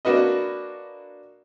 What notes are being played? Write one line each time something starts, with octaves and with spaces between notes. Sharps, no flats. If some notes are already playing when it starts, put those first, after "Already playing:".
A#3 D4 F#4 B4 D#5